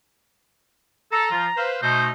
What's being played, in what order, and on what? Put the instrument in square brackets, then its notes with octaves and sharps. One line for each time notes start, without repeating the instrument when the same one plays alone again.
[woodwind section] A4 [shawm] A#5
[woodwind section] F3 F4
B4 C5 F5
[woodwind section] B2 A3 D#4 [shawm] C5